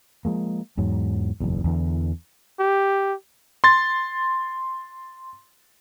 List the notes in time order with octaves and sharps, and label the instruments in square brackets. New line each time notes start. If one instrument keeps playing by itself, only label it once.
[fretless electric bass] F3 G#3 A#3
E2 G#2 F#3
F#1 B1 E2
E2 D3 E3
[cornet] G4
[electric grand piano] C6 A6